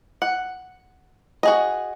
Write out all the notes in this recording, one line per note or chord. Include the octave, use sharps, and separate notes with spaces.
F#5
F#4 G#4 D#5